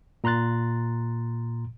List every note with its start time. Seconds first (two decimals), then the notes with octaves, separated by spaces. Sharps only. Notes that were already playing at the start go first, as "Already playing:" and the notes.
0.24 A#2 A#5 C6 F#6 A6